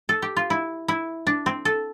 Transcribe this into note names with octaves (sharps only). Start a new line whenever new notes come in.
A4
G4
F4
E4
E4
D4
C4
A4